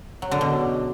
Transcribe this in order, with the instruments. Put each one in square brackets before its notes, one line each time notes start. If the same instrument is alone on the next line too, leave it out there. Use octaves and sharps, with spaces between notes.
[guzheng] F#3
D3
B2